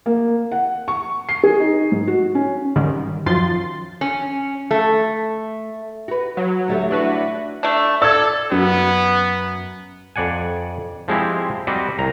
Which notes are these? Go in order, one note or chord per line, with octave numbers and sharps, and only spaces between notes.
A#3
F#5
C#6
C7
G#4
D#4
G#2
F#4
C#4
G#2 D3 D#3 G3
F#2 D#3 F3 F4 C6 A6
C#4
A3
F#4 B4
F#3
D2 G3 A3
E3 D4 F#4 B4
A3 D4
A4 D5 E6 G#6
F#2 B3
F2 D5 F#5 G#5
F3 G#3 C4 E4 G4
G3 C4 F#4 D5 D#5
C2 A#5